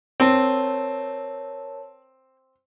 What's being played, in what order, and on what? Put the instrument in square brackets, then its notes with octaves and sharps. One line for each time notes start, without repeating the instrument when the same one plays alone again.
[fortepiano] C4 [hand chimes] A#4 C#5 A5